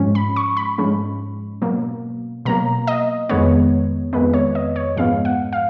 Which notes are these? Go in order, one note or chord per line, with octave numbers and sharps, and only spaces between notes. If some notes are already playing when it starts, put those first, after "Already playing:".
Already playing: G#2 F3 G#3 C#4
B5
C#6
B5
G#2 F3 G#3 C#4
B2 F#3 A#3
B2 F#3 A#3 A#5
D#5
F2 D#3 G#3 B3 C#5
F2 D#3 G#3 B3 B4
C#5
D#5
C#5
G#2 F3 G#3 B3 F5
F#5
F5